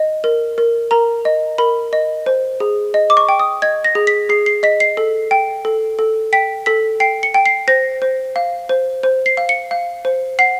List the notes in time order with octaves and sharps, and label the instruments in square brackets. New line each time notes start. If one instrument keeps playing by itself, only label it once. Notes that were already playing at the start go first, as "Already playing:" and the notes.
Already playing: [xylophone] D#5
A#4
A#4
A#4 A#5
D#5
A#4 B5
D#5
C5
G#4
D#5
D6
C#6
G5
D#6
D#5 G#6
A#6
G#4
B6
G#4 C7
C7
D#5 B6
C7
A4
G5
A4
A4
G5 B6
A4 B6
G5 C7
C#7
G5
C7
C5 A#6
C5
F5
C5
C5
C7
F5
C#7
F5
C5
F#5 C7